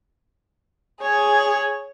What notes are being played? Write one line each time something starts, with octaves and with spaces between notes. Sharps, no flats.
G#4 C#5